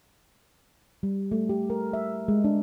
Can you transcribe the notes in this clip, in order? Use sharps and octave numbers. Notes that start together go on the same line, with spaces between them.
G3
A3
G4
A#4
E5
G#3
D4